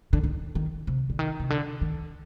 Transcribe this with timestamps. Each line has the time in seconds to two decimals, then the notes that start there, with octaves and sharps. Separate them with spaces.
0.13 D3
0.24 D#3
0.55 D#3
0.87 C3
1.10 D3
1.19 D#3
1.40 C3
1.50 D3
1.81 D#3